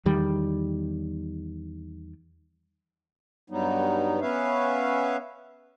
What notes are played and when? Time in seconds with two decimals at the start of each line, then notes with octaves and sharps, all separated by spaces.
0.06 E2 D#3 G3
3.50 G2 F#3 G3 B3 D#4
4.21 B3 C#4 B4 C#5 E5 F5